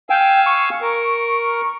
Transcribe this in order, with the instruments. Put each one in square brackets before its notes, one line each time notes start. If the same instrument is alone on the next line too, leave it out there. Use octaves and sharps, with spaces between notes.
[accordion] F5 G#5 E6 [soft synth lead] G5
[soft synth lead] C#6
[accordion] A#4